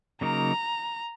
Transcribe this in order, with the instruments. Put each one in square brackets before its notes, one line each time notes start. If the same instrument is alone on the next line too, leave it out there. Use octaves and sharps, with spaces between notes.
[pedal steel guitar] C#3 F#3 A#3 D#4 A#4 [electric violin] A#5